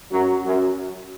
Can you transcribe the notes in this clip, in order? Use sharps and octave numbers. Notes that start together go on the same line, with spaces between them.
F#2 F#3
F#2 F#3